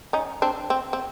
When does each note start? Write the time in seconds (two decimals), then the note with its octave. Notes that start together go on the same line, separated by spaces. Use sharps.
0.13 C#4 D#4
0.42 C4 D4
0.70 C4
0.93 C4